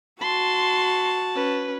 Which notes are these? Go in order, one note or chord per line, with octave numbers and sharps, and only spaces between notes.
F#4 A5 C6
C#4 B4